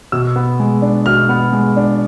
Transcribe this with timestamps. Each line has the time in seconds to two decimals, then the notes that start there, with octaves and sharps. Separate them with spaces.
0.12 B2 E6
0.36 B3
0.60 G#3
0.82 D4
1.06 B2 F6
1.29 B3
1.53 G#3
1.76 D4